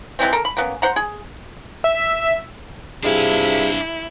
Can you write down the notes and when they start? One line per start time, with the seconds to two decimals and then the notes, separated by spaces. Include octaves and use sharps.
0.19 E3 G3 G#3 C4
0.33 A4 A#4
0.45 B5
0.57 A#3 B3 C#4
0.82 C5 F#5 A#5
0.96 G#4
1.84 E5
3.03 G2 C3 D4 E4 F4 G#4 G#5